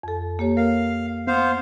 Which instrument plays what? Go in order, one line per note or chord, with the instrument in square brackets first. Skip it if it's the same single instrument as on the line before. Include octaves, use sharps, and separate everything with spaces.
[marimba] F2 A4
A#3 G4 C#5
[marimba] A#4 [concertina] F5
[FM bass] B3 [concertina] C5 F5